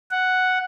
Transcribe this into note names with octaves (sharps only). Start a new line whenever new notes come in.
F#5